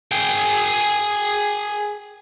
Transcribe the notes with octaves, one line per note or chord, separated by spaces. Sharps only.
G#4 G5